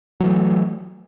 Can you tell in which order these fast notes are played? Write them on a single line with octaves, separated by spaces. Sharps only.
F#3 E3 A3